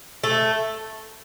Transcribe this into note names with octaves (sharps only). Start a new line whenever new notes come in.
A3